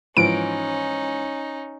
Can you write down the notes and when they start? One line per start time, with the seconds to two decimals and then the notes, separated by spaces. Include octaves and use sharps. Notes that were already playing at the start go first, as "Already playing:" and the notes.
0.17 G#2 E3 F3 C#4 D#4 D7